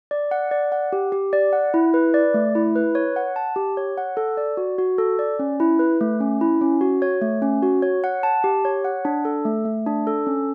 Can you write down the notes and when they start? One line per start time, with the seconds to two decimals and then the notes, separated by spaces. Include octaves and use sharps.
0.11 D5
0.31 F#5
0.51 D5
0.72 F#5
0.93 G4
1.12 G4
1.33 D5
1.53 F#5
1.74 E4
1.94 B4
2.14 D5
2.34 A3
2.55 E4
2.76 B4
2.95 C#5
3.16 F#5
3.36 A5
3.56 G4
3.77 C#5
3.98 F#5
4.17 A4
4.37 D5
4.57 F#4
4.78 F#4
4.98 A4
5.19 D5
5.39 C#4
5.60 E4
5.79 B4
6.01 A3
6.20 C#4
6.41 E4
6.61 C#4
6.81 F#4
7.02 C#5
7.22 A3
7.42 C#4
7.63 F#4
7.82 C#5
8.04 F#5
8.23 A5
8.44 G4
8.65 C#5
8.85 F#5
9.05 D4
9.25 A4
9.45 A3
9.65 A3
9.86 D4
10.07 A4
10.27 C#4